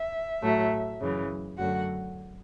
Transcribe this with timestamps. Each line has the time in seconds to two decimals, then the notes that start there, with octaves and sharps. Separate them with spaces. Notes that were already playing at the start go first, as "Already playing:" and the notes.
Already playing: E5
0.42 A2 F#3 A3
1.01 F#2 C#3 E3
1.58 F#2 D3 F#3 A3 F#4 F#5